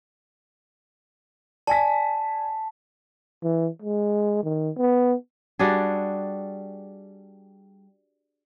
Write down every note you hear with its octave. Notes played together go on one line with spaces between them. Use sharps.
D5 G#5 A5 B6
E3
G#3
D#3
B3
G3 D4 F#4 G#4